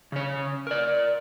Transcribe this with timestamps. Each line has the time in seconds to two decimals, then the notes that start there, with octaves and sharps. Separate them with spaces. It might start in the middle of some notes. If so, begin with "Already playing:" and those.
0.12 C#3 C#5
0.67 A#4 D5